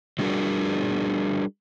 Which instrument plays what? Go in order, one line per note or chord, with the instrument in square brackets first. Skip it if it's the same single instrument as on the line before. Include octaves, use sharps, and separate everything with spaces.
[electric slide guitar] F#3 G3 D4 F#4 G#4 A#4